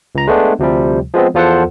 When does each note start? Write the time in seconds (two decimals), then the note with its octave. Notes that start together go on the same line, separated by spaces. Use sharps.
0.15 C#2 A#5
0.27 G#3 A3 B3 D4
0.59 D2 C3 F3 G3
1.14 F3 G#3 B3 C4
1.34 E2 F3 F4 A4 C5 F#5